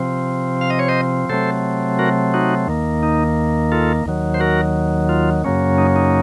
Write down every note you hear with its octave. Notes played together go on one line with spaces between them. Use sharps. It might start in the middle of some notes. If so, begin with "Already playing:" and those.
Already playing: C3 F3 C4
F5
D#5
C#5
C5 D#5
C3 F#3 A3 C4 A4 C5
F#4 A#4
D#4 F#4
D#2 D#3 A#3
D#4
F4 A4
D#2 D#3 F#3
C5
F#4 A#4
F4
F#2 C#3 F#3 A#3 C#4
D#4
D#4